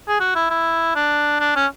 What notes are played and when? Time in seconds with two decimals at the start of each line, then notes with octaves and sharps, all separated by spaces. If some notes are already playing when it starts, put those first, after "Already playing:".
0.09 G#4
0.20 F#4
0.35 E4
0.50 E4
0.95 D4
1.40 D4
1.56 C#4